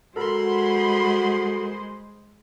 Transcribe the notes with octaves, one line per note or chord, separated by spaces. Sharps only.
G#3 F#4 A4 A#4 C5 B5 C6